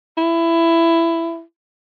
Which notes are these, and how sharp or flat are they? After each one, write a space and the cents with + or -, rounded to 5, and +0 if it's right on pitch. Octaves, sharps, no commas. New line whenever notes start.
E4 +15